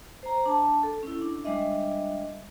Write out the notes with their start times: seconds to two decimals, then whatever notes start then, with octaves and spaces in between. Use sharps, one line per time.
0.23 C5 A#5
0.46 D4 A5
0.83 A4
1.03 C#4 E4
1.22 D4
1.44 G3 G#3 D4 D#5 E5